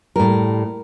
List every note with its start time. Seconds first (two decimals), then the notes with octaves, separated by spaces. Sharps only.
0.16 A2 G3 A#4